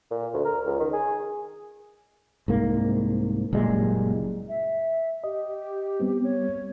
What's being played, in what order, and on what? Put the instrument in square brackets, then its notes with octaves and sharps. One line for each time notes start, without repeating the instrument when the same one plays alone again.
[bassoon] A#2
D2
A#4
C#2
D#3
G#4
[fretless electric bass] C2 G#2 A#3
F#1 A#2 G3 G#3
[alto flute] E5
[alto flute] G4 [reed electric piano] D#5
[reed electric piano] G3 B3 C4
[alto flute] C#5